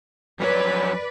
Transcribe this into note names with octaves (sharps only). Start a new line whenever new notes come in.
F2 F#3 B4 C#5 D5